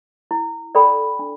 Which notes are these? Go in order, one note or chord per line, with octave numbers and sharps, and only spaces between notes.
E4
A4 D5 G5 B5
D4